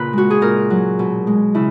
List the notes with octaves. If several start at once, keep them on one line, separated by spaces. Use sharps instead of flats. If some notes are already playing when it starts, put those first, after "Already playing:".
Already playing: A#2 C#3 B4
G#3 F#4
G#4
A#2 A#4
F#3
B2
G#3
C#3 E4